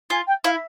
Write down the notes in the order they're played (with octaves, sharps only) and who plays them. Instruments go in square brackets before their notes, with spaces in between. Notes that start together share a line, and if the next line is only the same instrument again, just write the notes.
[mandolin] F4 [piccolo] G#5
[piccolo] G5
[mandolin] E4 [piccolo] F5